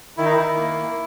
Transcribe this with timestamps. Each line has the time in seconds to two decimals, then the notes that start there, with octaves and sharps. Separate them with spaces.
0.17 D#3 E4
0.25 D#4
0.32 E4
0.38 D#3
0.57 A#3
0.76 A#3